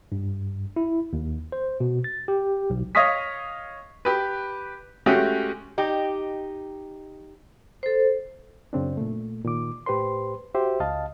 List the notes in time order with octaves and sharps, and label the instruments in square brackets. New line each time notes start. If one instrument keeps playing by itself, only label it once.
[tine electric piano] G2
E4
D#2
C5
B2
A6
G4
B1
[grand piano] C#5 D#5 F5 C#6 D#6 B6
G4 B4
G#3 A3 C#4 F#4 G4
[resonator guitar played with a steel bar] D#4 G4
[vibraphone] A4 C5
[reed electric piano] F#2 C#3 C4 D4
A#2 A3
A#2 D#3 D6
A2 G4 B4 C5 C6
F#4 G4 C5 E5
C#2 D#5 F5 A5